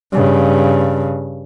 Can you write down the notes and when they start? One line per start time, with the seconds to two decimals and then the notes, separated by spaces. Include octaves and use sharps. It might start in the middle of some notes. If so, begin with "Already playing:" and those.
0.13 G2 C#3